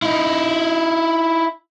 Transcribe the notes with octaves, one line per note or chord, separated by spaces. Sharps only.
D#4 E4